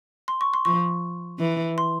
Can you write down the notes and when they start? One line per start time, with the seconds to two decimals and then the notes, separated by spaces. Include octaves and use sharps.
0.28 C6
0.41 C#6
0.54 C6
0.65 F3 C#6
1.40 E3
1.78 C6